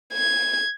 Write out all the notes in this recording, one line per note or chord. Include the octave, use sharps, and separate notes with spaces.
G#6